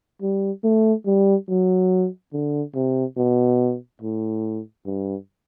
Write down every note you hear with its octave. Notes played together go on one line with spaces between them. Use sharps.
G3
A3
G3
F#3
D3
C3
B2
A2
G2